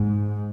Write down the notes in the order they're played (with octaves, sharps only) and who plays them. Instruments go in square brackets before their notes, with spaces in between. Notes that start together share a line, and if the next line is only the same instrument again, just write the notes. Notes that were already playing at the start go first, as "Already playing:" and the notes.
Already playing: [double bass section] G#2